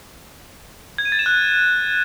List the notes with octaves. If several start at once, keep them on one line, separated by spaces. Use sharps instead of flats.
G#6
D#7
A6
E7
F#6